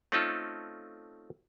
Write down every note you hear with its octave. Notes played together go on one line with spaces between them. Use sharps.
A3 C4 C#4 D#4 F4 A4